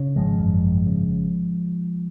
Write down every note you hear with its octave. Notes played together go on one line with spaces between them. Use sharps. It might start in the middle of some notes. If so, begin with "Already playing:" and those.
Already playing: C#3
G#1 F3 G#3
F#2
G#1
C#3